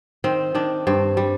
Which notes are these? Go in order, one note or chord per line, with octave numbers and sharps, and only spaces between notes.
D#3 C4
D#3 D4
G2 C4
G3